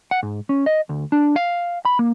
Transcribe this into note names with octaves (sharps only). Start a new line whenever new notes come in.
F#5
G#2
C#4
D#5
D2
D4
F5
B5
A#3